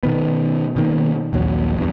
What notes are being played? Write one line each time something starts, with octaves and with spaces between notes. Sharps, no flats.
B2 D#3 B3
B2 D#3 A#3
A#1 D#2 F#3
E2 G2